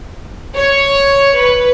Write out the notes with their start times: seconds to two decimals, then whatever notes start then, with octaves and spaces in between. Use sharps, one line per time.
0.57 C#5
1.38 B4